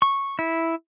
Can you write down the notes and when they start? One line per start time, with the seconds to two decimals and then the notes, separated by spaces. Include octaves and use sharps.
0.02 C#6
0.39 E4